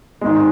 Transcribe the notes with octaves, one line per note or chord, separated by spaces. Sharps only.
G#1 G#2 D#3 G#3